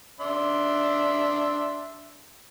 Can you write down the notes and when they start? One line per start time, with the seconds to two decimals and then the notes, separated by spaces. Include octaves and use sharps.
0.20 D4 E5 C6